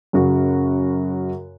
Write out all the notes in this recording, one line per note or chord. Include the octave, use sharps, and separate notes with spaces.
F#2 C#3 F#4